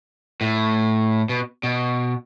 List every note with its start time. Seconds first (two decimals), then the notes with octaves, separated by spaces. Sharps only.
0.41 A2
1.29 B2
1.63 B2